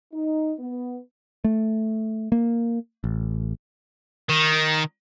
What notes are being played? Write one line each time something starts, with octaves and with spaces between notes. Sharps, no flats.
D#4
B3
A3
A#3
A1
D#3